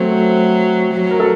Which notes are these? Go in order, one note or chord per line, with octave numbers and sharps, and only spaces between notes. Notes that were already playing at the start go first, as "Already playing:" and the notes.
Already playing: F#3 A3 C4
F#3
A#4
A4